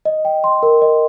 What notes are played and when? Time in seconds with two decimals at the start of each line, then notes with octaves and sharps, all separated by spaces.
0.05 D#5
0.25 G5
0.44 C6
0.63 A#4
0.82 D#5